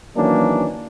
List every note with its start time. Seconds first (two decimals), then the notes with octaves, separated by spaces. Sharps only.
0.15 D#3 E3 F#3 A#3 C#4 D4